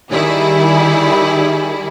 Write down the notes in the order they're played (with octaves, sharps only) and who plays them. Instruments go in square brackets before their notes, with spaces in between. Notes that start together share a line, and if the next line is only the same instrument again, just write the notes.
[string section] D#3 G3 E4 G#4